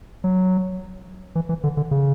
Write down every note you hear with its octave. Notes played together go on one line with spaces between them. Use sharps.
F#3
E3
E3
D3
D3
C#3